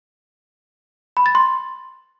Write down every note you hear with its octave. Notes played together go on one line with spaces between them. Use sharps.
B5
A6
C6